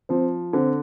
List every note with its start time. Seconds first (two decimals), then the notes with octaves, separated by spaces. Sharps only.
0.09 F3 C4
0.53 D3 C4